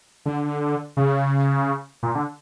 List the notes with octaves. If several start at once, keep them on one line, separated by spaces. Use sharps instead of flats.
D3
C#3
A#2
D3